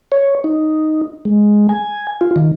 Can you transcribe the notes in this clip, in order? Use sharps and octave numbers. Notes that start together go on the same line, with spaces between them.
C#5
D#4
G#3
G#5
F4
D#3